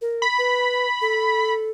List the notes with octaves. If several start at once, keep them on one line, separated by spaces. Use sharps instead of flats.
A#4
B5
B4
A4